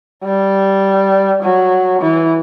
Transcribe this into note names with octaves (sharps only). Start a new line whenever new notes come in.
G3
F#3
E3